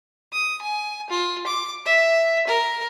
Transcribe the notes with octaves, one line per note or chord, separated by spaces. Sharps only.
D#6
G#5
F4
D6
E5
A#4